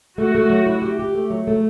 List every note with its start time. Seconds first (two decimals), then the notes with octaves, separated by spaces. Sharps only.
0.18 A3 F#4
0.35 A3
0.50 F#3
0.66 E4
0.82 G4
0.99 G4
1.15 A3
1.30 F#3
1.47 A3